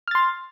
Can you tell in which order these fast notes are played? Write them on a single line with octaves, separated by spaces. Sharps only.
F6 A6 C6